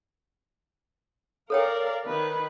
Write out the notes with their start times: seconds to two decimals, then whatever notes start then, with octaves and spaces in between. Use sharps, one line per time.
1.50 A4 A#4 C#5 D5 F5 G5
2.04 D#3 B4